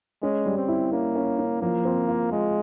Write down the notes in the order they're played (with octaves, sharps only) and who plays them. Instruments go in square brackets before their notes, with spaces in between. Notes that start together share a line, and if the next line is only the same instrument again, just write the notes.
[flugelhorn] G#3 [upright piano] C#4
[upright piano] G3
[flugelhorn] C4
[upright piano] E4
[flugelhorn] A#3 [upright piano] C#4
[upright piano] C#4
C#4
[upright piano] F3 [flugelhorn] A#3
[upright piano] C4
F4
[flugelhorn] G#3 [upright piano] F4